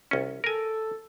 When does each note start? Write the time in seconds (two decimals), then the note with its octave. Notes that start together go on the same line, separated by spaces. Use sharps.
0.11 C2 C#4
0.44 A4 A#4 G#5